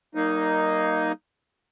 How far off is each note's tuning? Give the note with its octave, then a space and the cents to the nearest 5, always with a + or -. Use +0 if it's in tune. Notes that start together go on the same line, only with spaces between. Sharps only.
G3 -45 A#3 +0 D#4 +0